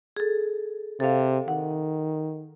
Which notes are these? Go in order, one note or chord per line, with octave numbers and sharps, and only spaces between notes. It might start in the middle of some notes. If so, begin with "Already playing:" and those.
G#4 A4
C3 A4 F5
D#3 F#5